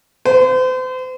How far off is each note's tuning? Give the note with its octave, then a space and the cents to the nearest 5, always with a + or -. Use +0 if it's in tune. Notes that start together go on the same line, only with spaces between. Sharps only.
C5 -40